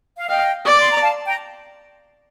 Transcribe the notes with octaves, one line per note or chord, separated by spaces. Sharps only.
F5
D#5 F5 G5
D5 D6
C6
A#5
F5 A5
G5 A#5